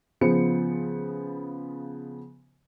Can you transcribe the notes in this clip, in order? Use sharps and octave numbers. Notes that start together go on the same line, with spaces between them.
C#3 F3 B3 C5 C#7